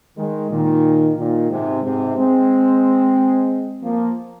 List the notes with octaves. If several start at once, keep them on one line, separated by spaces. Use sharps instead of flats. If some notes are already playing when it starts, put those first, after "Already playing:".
D#3 G#3
A#2 D#3
A#2 D#3
G#2 C3
G#2 C3
G#3 C4
F3 A#3